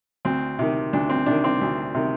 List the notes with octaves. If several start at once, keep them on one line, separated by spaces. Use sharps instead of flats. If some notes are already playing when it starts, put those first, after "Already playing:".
D2 C4
C3 D#3
D2 D4
C4
C3 D#3 D4
C4
D2
C3 D#3